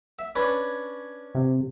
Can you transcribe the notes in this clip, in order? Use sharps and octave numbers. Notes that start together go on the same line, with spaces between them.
E5
C#4 D4 B4
C3